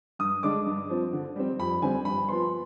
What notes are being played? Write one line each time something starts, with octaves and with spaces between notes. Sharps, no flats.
G2 D#6
D3 G#3 D4 D6
G2
F3 C4
D3
G3 C4
F2 B5
D3 G3 C4 G#5
G2 B5
F3 B3 C6